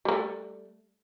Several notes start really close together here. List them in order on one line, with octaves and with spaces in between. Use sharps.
G3 A#3 A3